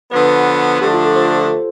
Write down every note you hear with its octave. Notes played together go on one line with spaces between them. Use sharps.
D3 F3 B3 B4
D3 F3 A3 D4 G4
F4
A4
C5